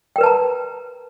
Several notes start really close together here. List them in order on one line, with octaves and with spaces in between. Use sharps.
G5 A#4 B4 A5 A#5